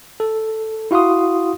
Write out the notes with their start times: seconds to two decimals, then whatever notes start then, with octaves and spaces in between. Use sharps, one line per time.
0.20 A4
0.91 E4 F#4 F5 C6 D#6